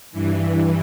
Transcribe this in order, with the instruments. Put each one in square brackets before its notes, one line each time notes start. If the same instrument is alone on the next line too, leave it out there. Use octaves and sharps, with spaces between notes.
[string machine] G2 E3